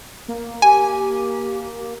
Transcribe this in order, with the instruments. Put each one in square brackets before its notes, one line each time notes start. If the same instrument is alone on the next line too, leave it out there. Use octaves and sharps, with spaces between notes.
[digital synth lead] A#3
[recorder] G4 [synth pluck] G#5